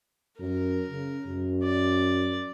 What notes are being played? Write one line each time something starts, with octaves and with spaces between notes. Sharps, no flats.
F#2 A#4
C#3
F#2
D5